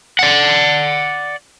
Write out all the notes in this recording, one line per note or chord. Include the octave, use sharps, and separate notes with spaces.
D5 F#5